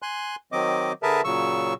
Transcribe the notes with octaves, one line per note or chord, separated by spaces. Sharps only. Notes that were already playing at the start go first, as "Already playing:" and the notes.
G#5 C6 F#6
D#3 F#3 C4 D#5 D6
D3 G#4 A#4 B4 E5 A5
A#2 C#3 F#3 C#6 E6